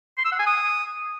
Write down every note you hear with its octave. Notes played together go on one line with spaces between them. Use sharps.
C6
E6
F#5
G#5
D#6